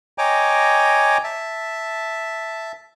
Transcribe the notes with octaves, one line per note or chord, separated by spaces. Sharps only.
C#5 D#5 G5 G#5 A#5 D6
E5 A5